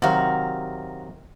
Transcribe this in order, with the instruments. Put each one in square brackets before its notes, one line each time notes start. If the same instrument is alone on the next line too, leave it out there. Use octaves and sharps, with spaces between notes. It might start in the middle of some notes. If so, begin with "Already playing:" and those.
[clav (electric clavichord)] C3 D#3 F#3 [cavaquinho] F#4 F5